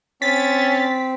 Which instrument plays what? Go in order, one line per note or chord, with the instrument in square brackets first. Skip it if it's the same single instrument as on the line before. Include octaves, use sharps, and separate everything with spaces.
[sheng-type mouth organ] C4 [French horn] C#4 [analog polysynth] A6 [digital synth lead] B6